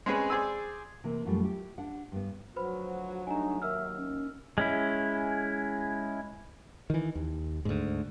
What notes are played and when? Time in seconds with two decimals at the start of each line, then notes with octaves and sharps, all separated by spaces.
0.06 G#3 C4 C#4 G#4 B4
0.30 G#4 C5 D5 G#5 E6
1.04 C3 E3 A#3
1.25 F#2 B2 F3 G3 A3
1.42 E4 G4
1.78 D4 F#5
2.12 G2 B3
2.56 D2 F3 F#3 F#4 B4 C5 B5
3.27 G3 A3 D4 D#4 G#5 A#5
3.62 D#2 A#4 E5 E6 F6
3.97 C#4
4.58 G#3 C#4 E4
6.90 D#3 E3
7.15 D#2
7.65 D2 G#2